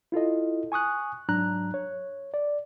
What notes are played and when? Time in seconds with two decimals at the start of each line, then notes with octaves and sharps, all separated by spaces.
0.12 E4 F4 A4 D#5
0.72 G#5 C#6 D#6 F#6
1.29 G#2 F#3 D4 A#5 F#6
1.74 C#5
2.34 D5